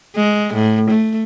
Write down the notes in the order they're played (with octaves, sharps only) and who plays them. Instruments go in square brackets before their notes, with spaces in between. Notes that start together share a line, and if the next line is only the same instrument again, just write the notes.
[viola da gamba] G#3
A2
A3